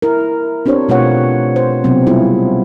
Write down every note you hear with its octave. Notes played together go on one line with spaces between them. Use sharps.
E4 A#4
C4 D4 G4 C5 C#5
B2 A3 F4 B4 C#5 F#5
C5
C3 F#3 B3 C4
F#3 G3 B3 E4 F4 G#4